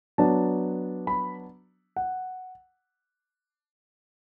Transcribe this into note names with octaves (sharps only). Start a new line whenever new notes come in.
F#3 B3 D4 A5
B5
F#5